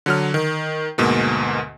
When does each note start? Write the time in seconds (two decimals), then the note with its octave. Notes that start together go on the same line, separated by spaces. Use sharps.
0.06 D3 F#3 F6
0.34 D#3
0.98 D2 G#2 B2 A#3